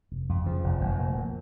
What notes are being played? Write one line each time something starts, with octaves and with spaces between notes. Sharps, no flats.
F1
F2
C#3 F3
F1
F1
A#2
A#2